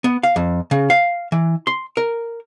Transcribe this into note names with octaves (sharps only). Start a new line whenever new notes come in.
B3
F5
F2
C#3
F5
E3
C6
A#4